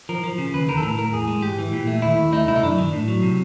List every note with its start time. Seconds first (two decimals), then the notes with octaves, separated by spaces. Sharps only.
0.09 F3 A#4
0.24 F3
0.38 C#3
0.53 D#2 B4
0.69 D#3 A#4
0.77 A4
0.83 A2 A#4
0.98 A2 A#4
1.13 E2 G#4
1.28 G#3
1.42 G#2 G4
1.58 E3
1.72 A#2
1.87 A3
2.02 D#2 E4
2.17 D#2
2.32 A3 D#4
2.47 C2 E4
2.55 D#4
2.63 F#2 D4
2.78 D#3
2.93 A2
3.08 F#3
3.23 C3